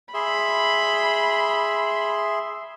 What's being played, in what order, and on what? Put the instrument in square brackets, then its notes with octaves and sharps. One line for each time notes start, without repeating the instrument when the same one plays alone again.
[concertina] G#4 E5 C6 [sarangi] B5